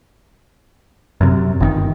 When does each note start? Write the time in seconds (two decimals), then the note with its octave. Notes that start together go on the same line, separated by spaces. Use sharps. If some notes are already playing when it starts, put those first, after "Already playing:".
1.21 F#2 C3
1.60 G1 C3 D#3